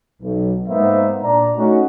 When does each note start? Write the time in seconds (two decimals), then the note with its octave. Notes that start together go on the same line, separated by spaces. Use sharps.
0.22 B1
0.68 G#2 A#3 B3 D#4 C5 E5
1.22 A#2 D4 A#5
1.57 A3 C#4 D#4 F#4